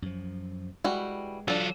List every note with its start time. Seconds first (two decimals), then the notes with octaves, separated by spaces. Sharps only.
0.02 F#2 F3
0.84 E3 G3 G#3 F#4
1.48 F#3 D4 F4 A4